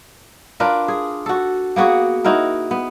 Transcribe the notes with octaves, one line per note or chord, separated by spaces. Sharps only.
D4 F4 A#4 B4
G#4
F#4 A4
A#3 B3 F#4 G#4
D#4 E4 F#4 A#4
B3